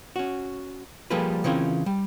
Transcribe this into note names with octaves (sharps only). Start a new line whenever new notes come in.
C#4 F#4
F3 G3 A#3 G#4 A4 B4
C#3 E3 C4 C#4 F4 A#4
G3